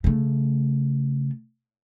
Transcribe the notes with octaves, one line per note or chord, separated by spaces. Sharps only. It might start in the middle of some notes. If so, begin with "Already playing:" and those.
C#3 A3